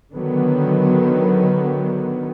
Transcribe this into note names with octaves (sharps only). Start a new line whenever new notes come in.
D3 D#3 F#3 B3